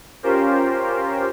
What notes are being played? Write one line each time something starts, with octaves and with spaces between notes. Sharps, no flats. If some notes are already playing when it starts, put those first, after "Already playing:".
C#4 F4 G4 A#4 C5